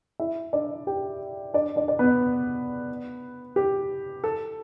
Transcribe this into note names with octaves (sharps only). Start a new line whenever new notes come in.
E4 E5
D4 D5
G4 G5
D4 D5
D4 D5
D5
B3 B4
G4
A4